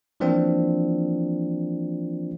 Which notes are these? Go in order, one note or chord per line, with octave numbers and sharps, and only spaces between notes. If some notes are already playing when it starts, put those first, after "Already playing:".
E3 F3 A#3 C4 D4 F4